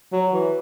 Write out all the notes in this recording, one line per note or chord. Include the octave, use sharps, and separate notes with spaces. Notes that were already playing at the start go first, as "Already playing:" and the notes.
F#3
E3